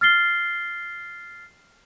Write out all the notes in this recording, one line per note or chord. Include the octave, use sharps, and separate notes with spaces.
F6 A6 C7 G7